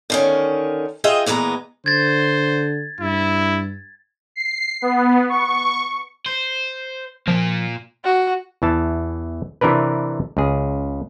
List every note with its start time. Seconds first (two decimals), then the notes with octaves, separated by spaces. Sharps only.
0.10 D3 D#3 C#4
1.04 F4 G#4 D#5 E5 G5
1.26 A#2 E3 G#3 B3 A#5
1.86 D3 C5 G#6 A6
3.01 G2 E4
4.36 C7
4.82 B3
5.29 C#6
6.26 C5
7.28 A#2 F3 A#3
8.04 F#4
8.62 E2 E3 A5
9.61 C3 E3 D4 A#4 B4
10.37 C#2 G#4